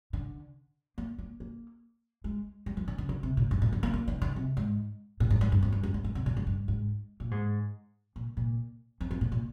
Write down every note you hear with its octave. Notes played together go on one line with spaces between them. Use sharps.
D3
A#3
A#3
A#3
G#3
G3
F3
D#3
D3
D3
C3
A#2
G2
A#2
D3
A#3
A#3
D#3
D#3
C3
G#2
A#2
G#2
G#2
G2
F2
G2
G2
G#2
G#2
C3
A#2
G#2
G2
G#2
A#2
G#2
A#2
A#2
F2
F2
A#2
A#2